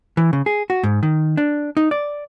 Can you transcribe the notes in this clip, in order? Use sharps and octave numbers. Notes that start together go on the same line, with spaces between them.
E3
C#3
G#4
F#4
G#2
D#3
D4
D#4
D5